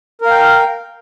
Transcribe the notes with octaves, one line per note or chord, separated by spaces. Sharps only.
A#4 F5 G5